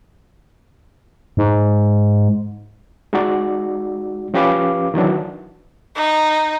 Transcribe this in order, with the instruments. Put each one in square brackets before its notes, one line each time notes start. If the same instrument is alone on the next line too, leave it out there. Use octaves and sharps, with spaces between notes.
[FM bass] G#2
[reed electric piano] G#3 D#4 F#4 D5
F3 C#4 G4 B4 F5 D6
D#3 E3 F#3 D4
[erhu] D#4